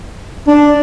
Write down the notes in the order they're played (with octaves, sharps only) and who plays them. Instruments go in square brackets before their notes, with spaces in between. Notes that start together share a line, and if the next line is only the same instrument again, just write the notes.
[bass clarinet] D4